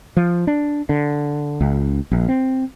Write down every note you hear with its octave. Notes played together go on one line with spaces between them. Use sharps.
F3
D4
D3
C#2
A#1
C4